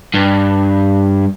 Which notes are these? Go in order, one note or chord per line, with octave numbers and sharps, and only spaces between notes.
G2